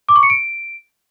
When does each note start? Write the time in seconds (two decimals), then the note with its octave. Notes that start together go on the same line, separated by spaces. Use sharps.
0.09 D6
0.16 C#6
0.23 C#7
0.30 D7